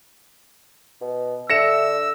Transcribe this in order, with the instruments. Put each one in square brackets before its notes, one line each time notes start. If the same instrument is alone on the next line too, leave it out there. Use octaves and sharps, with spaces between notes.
[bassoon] B2
[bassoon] D3 [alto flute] E5 [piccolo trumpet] E6 [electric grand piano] A#6 C#7 E7